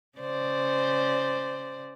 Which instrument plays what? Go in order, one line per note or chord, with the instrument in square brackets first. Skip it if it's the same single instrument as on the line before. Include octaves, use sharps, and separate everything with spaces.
[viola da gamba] C#3 C5 D5